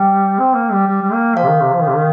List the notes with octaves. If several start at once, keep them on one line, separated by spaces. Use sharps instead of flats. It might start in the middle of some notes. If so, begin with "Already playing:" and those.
Already playing: G3 G5
C4
A#3
G3
G3
G3
A#3
F3 F5
C3
D#3
C3
F3
D#3
C3
D#3